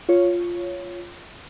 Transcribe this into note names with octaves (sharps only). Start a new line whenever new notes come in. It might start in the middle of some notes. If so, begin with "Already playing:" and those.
F4 C#5